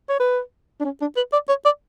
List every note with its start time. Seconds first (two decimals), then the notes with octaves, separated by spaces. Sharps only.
0.09 C#5
0.20 B4
0.81 D4
0.85 C#4
1.01 D4
1.17 B4
1.33 D5
1.49 C#5
1.65 D5